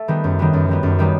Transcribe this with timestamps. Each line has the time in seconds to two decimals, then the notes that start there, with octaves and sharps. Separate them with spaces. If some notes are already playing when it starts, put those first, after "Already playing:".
Already playing: A3
0.08 D#3 G3 B3
0.24 F#2
0.39 D#3 G3 B3
0.53 F#2
0.68 D#3 G3 B3
0.83 F#2
0.99 D#3 G3 B3